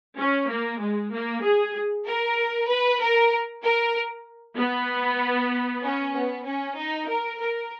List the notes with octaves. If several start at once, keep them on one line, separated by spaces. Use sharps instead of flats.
C#4
A#3
G#3
A#3
G#4
A#4
B4
A#4
A#4
B3
C#4
B3
C#4
D#4
A#4
A#4